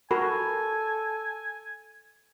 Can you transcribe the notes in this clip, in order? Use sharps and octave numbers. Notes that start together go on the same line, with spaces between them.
F#4 A4 A#4 G#5 B5